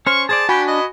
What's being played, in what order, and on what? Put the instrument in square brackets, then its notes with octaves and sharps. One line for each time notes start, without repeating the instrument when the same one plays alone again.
[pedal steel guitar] C#4 C5 [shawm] C#6 [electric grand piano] F6
[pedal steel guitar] G#4 C5 D5 [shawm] A5
[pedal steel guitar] D4 [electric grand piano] F#4 G#5 B5 [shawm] G4
[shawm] D#5